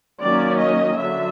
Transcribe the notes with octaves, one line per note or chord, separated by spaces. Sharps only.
D#3 F#3 A#3 C#4 D5
D#5
D3 F#3 E5